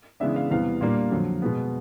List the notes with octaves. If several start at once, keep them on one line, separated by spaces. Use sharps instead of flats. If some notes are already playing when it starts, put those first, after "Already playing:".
C#3 E3 G#3 B3 D4 E5
F5
E2 C3 E3 G3 B3 F5
A#2 G3 A#3 D4
F2 D3 F#3
B2 G#3 B3